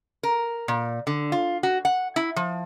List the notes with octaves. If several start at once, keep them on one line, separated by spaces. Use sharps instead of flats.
A#4
A#2
D3
F4
F#4
F#5
E4
F3